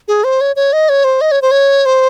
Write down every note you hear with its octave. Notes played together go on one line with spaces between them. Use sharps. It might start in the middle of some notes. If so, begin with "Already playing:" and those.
G#4
C5
C#5
C#5
D#5
C#5
C5
D#5
C#5
C5
C#5
C5